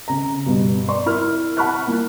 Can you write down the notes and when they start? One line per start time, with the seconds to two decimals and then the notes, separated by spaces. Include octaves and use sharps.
0.08 C#3 A#5
0.46 G2 B2
0.89 D5 C6 C#6
1.06 E4 A#4 F6
1.57 F#5 A5 B5 C#6 F6 F#6
1.87 A#3 E4 F4